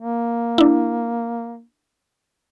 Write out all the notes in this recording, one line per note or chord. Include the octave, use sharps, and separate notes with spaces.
A#3
D4 E4